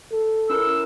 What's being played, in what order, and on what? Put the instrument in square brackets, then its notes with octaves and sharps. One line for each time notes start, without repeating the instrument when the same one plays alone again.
[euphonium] A4
[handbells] C#4 E4 A#4 [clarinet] E6